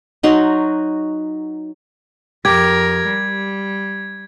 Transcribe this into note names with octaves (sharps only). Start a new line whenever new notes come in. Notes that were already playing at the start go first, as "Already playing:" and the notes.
F#3 D#4 F#4 C6
F2 G4 A#4 G#6
G3